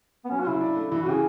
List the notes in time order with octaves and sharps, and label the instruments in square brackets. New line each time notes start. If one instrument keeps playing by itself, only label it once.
[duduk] B3
[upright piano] F#3 [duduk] C#4
[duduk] F#4
[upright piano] C#3 [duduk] E4
[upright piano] D4
A3
[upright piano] E3 [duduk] E4
[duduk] F#4
[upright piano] C#3 [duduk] G#4